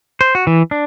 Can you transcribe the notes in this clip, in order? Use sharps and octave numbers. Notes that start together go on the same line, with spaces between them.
C5
F#4
E3
D4